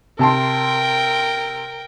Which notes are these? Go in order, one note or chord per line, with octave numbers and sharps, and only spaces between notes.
C3 A#4 G5 A5 C6